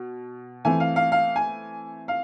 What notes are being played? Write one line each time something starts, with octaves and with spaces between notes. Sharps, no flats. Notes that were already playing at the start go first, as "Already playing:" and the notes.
Already playing: B2
E3 A3 C4 G#5
F5
F5
F5
G#5
F5